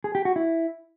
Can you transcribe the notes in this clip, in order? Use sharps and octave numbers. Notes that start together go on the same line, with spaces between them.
G#4
G4
F#4
E4